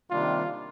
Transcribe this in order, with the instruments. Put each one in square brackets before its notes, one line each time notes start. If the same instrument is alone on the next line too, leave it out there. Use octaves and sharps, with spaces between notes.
[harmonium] C3 D#3 G3 A#3 D4 [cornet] F4